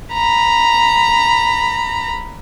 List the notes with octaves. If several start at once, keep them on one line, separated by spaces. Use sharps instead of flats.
A#5 B5